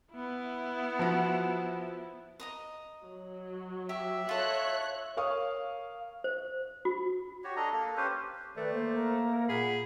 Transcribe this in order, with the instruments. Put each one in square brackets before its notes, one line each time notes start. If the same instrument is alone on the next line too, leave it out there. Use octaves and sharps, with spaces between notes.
[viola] B3 E4
[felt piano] F3 F#4
[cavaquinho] D#5 A#5 D#6
[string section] F#3
[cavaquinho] G4 [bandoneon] E5
[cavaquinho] F4 A4 D#5 [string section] C#5 F#6
[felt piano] A#4 C#5 F5 C#6 D#6
[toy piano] C5
F#4
[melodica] F#4 G4 C#5
D4 A4 D#5 A#5
A#3 A4
C#4 G4 B4 C5
[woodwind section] D#3 D5 [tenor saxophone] A3 [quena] B4
[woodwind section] A#3 [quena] C5
[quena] A#4
[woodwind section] A#2 B5 [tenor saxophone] G#4 [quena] F#5